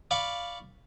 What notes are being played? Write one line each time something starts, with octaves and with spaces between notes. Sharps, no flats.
D5 F5 B5 C#6